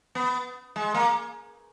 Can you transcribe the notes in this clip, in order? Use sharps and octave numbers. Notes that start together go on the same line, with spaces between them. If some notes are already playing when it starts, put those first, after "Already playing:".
B3
G#3
A#3